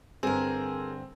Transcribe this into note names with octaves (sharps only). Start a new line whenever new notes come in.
G2 D3 C4 G#4 A#4